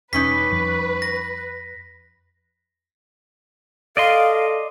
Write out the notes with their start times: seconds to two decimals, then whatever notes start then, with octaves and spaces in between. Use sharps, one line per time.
0.13 E1 G3 C#4 D#4 B4 B6
0.51 F2 F3
1.02 A#6
3.97 A4 D5 D#5 F5 C6